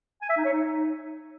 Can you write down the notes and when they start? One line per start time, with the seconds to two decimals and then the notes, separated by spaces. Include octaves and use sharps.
0.22 G#5
0.29 E5
0.37 D#4
0.45 C#5
0.53 D#4